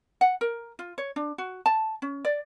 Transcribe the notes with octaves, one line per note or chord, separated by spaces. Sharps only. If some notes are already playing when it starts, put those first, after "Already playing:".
F#5
A#4
F4
C#5
D4
F#4
A5
C#4
D5